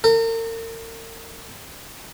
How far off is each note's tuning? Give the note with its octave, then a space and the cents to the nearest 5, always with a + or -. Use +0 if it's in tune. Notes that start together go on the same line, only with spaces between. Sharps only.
A#4 -40